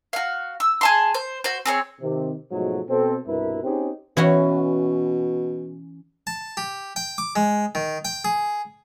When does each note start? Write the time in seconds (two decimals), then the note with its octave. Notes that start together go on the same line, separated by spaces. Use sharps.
0.13 F#4 F5
0.60 E6
0.81 G#4 A5 C6
1.14 C5
1.44 F#4 C5
1.66 C4 G#4 C#5
2.01 C3 D#3
2.51 G#2 B2 F3 F#3 G#3 A3
2.88 B2 C4 A4
3.26 C2 G2 B2 E4 A#4 B4
3.64 C4 C#4 D#4 G4 G#4
4.17 B2 E3 C#4 F#4
6.27 A5
6.57 G4
6.96 G5
7.18 D6
7.36 G#3
7.75 D#3
8.05 G5
8.25 G#4